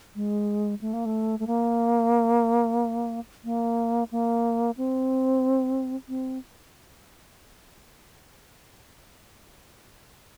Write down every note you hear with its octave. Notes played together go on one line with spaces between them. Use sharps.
G#3
A3
A#3
A3
A3
A#3
A#3
A#3
C4
C4